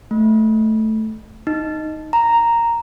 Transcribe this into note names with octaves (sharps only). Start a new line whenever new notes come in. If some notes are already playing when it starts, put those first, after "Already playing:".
A3
D#4
A#5